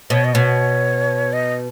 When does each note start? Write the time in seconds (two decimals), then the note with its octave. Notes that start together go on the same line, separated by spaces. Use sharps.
0.10 B2 C#5
0.24 D#5
0.34 B2 C#5
1.33 D#5